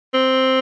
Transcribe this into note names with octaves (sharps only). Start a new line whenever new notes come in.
C4